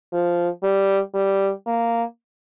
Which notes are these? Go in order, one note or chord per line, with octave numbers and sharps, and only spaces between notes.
F3
G3
G3
A#3